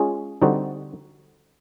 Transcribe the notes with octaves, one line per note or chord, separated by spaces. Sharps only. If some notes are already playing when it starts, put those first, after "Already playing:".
Already playing: G#3 C#4 F4 G#4
D3 G3 C4 D#4 F#4